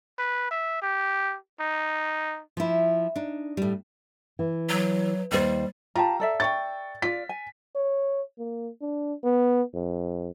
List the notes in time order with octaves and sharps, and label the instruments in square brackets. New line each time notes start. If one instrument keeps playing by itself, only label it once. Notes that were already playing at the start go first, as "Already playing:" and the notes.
[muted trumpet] B4
E5
G4
D#4
[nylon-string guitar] F3 E4
D4 D#4
A2 G3
E3
[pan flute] F#3
[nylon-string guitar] D#2 C5 [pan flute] G3
[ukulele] F4 G4 A5 [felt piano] A#5
[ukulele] A4 D5 E5
[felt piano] G5 C#6 A6
[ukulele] F4 D5 [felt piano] B6
[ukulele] G#5
[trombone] C#5
A#3
D4
B3
F2